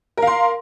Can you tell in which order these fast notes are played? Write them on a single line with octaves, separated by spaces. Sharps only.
A#4 F5 C6